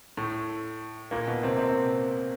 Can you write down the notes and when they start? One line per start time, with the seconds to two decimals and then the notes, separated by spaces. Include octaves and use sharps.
0.17 A2 A3
1.11 A#2 A#3
1.27 B2 B3
1.43 C3 C4
1.59 C3 C4